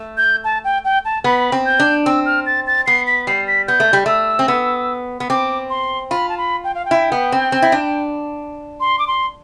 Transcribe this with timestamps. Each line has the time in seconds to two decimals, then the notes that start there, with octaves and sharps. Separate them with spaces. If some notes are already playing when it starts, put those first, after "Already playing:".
Already playing: A3
0.17 G6
0.44 A5
0.64 G5
0.85 G5
1.05 A5
1.24 B3 B5
1.52 C4
1.66 G6
1.79 D4
2.06 C4 E6
2.26 F6
2.46 A6
2.67 A6
2.87 B3 C7
3.07 B6
3.27 G3 C7
3.48 B6
3.68 B3 G6
3.80 A3
3.93 G3
4.06 A3 E6
4.39 C4
4.48 B3
5.20 B3
5.30 C4 D6
5.70 C6
6.11 F4 B5
6.29 A5
6.38 B5
6.64 G5
6.75 F5
6.85 G5
6.91 E4
7.12 B3
7.32 C4
7.52 C4
7.62 E4
7.72 D4
8.80 C6
8.99 D6
9.07 C6